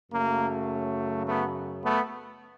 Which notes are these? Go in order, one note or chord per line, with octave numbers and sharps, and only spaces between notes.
F#2 C#3 F#3 A3 A#3
A3 B3
A3 B3